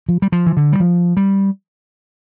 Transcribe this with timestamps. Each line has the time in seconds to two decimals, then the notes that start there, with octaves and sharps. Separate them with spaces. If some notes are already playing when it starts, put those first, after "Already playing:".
0.09 F3
0.22 G3
0.32 F3
0.47 E3
0.57 D3
0.72 G3
0.80 F3
1.17 G3